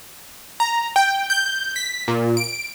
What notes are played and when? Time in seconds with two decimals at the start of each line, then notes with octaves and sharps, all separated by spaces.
0.60 A#5
0.96 G5
1.30 G6
1.76 B6
2.08 A#2
2.37 D7